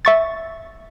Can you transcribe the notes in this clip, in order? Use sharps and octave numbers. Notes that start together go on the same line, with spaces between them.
E5 C#6 A6